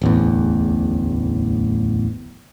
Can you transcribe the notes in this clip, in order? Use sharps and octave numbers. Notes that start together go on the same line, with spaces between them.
D1 A1 E2